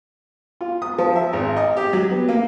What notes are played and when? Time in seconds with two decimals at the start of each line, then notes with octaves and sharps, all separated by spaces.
0.61 F4
0.82 D#6
0.98 F3
1.16 E5
1.33 G#1
1.56 D#5
1.77 G4
1.93 F#3
2.10 B3
2.29 A#3